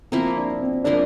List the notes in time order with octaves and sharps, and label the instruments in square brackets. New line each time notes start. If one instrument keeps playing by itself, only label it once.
[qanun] F3 A#3 E4 A#4 [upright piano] C4
[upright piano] D4
D4
C4
[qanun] F3 A#3 E4 A#4 [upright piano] D4